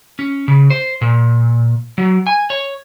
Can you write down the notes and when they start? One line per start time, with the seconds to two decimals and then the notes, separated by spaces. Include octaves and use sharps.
0.19 C#4
0.48 C#3
0.70 C5
1.01 A#2
1.98 F#3
2.27 G#5
2.50 C#5